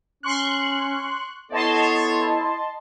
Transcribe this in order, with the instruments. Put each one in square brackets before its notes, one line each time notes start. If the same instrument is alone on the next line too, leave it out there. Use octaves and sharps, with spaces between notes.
[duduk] C#4 [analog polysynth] C6 C#6 F#6
[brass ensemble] B3 A4 C#5 [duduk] E4 [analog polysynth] D#5 A5 C6